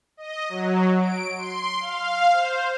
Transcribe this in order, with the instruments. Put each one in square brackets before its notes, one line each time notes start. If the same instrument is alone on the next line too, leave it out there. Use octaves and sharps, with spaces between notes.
[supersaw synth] D#5
F#3
D7
C6
F5
C5